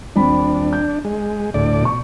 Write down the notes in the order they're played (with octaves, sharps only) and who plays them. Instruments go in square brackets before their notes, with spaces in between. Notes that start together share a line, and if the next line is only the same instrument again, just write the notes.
[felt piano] D#1 C4 B5 [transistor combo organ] D4
[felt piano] G6
[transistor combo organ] G#3
D2 A2 D5
[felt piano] B2 C#6